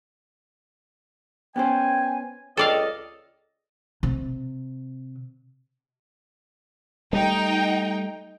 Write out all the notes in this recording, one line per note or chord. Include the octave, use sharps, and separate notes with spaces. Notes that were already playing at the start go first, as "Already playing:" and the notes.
B3 C#4 C5 G5 G#5
C#2 A4 D5 D#5 F5 G5
C3
G3 A3 D#4 G5